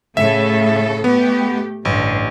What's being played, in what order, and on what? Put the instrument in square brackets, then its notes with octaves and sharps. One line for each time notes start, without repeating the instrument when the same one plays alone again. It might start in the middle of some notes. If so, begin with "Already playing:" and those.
[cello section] A2 C#3 A4 [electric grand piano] E5
[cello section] A3 G4 [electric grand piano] B3
[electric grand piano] A1 [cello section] G2 D3